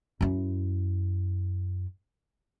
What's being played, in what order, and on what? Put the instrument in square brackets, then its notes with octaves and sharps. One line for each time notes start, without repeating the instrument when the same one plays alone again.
[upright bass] F#2 E4